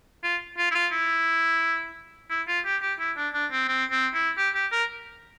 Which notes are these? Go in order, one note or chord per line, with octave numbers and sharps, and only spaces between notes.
F4
F4
E4
F4
E4
E4
F4
G4
G4
E4
D4
D4
C4
C4
C4
E4
G4
G4
A#4